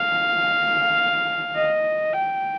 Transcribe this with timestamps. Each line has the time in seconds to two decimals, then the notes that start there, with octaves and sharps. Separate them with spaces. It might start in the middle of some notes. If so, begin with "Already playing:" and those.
Already playing: F5
1.55 D#5
2.13 G5